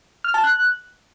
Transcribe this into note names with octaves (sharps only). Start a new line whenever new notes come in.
F6
A5
F#6